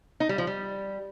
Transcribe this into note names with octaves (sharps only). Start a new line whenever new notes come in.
D#4
G3
F3
G3